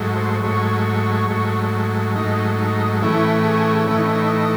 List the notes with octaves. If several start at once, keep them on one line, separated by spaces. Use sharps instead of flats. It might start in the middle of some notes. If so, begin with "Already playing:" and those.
Already playing: G#2 F#3 A3
C5
G#2 F#3 A3 C#5
G#2 F#3 A3
G#2 F#3 A3 D#4
D#4
A2 E3 A3 C#4 E4
G#4
A2 E3 A3 C#4 E4
D#4
C#4
D#4